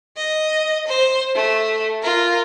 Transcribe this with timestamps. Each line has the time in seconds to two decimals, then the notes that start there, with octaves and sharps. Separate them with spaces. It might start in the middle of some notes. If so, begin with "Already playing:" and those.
0.16 D#5
0.87 C5
1.35 A3
2.02 F4 A#4